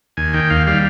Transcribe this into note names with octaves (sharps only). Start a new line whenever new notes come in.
D#2 G#5
D#3 G5
D#2 F5
G3 F5